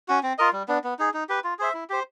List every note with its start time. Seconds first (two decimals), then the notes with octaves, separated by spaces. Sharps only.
0.08 C#4 F#4
0.23 C4
0.38 F4 A#4 D#5
0.53 G3
0.68 B3 D4
0.84 B3
0.99 D#4 G#4
1.14 D#4
1.29 G4 B4
1.44 F4
1.59 G#4 C5 E5
1.74 E4
1.90 G4 C5